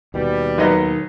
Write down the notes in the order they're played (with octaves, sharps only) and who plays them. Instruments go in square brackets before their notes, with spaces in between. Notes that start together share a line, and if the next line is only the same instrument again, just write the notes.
[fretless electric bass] D#2 B2 [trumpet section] G3
[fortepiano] B1 B4 D#5 [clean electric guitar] D#4 A#4 C#5